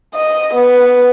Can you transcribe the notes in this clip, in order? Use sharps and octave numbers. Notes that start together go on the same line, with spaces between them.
D#5
B3